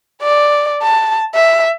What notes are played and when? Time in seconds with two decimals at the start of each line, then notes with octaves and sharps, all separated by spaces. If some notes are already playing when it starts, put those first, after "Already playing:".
0.22 D5
0.82 A5
1.35 E5